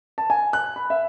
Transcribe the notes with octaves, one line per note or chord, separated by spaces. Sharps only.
A5
G#5
F#6
B5
E5